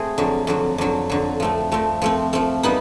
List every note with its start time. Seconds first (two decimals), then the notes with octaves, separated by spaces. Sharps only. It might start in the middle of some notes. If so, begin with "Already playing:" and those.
Already playing: A3 C4 G#4
0.18 F2 D3 F#3
0.47 F2 D3 F#3
0.78 F2 D3 F#3
1.10 F2 D3 F#3
1.40 F3 A3 C4
1.72 F3 A3 C4
2.02 F3 A3 C4
2.33 F3 A3 C4
2.63 G3 B3 D#4